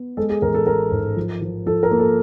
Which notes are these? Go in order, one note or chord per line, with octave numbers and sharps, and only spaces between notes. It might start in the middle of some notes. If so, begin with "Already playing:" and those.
Already playing: B3
G#3 A4
G#4
A1 A#4
A4
G#3 A#4
G#2
F3
F3
F3 A4
A#4
A#3
A4